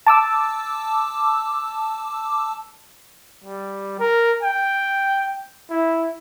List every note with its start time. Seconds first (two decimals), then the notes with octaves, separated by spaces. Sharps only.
0.07 A5 D6 E6
3.44 G3
3.99 A#4
4.43 G5
5.70 E4